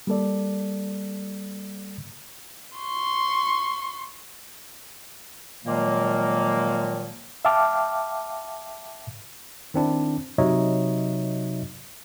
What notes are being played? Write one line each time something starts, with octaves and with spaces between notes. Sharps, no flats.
G3 A#3 A4 D5
C6 C#6
A#2 D#3 F3 F#3 G#3 A#3
E5 F5 G5 A5 D6 F6
D#3 C4 D4 E4
C3 F#3 D#4 C#5 D#5 E5